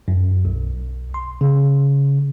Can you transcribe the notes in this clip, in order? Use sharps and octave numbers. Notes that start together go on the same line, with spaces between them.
F#2
B1
C6
C#3